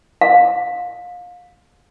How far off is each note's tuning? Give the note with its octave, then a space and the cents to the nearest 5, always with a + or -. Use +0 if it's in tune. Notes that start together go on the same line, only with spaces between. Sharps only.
F5 +30